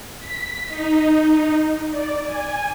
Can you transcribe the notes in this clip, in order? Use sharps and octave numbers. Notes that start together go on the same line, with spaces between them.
B6
D#4
D5
G#5